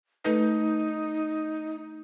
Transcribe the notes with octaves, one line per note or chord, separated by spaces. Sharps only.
A3 D#4 A4 B4